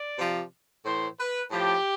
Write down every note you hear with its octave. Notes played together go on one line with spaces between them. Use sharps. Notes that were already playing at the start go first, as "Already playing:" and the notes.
Already playing: D5
C3 F3
A2 E3 C5
B4
A2 F3 G4